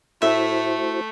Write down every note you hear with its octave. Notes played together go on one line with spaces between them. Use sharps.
A2 A3 E4 F#4 C5 E5